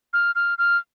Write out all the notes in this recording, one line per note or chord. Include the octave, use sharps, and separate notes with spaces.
F6
F6
F6